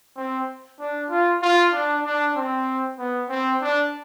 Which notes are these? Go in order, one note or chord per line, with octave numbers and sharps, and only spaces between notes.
C4
D4
F4
F4
D4
D4
C4
B3
C4
D4